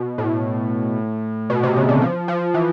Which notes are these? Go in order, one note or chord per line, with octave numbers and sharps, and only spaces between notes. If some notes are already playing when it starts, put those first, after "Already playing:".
Already playing: B2
A2
B2
C3
C#3
D3
F3
F3
E3